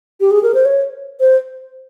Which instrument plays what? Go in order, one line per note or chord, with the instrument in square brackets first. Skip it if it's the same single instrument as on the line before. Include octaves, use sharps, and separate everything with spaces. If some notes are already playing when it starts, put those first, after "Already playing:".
[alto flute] G4
G#4
A#4
C5
C#5
C5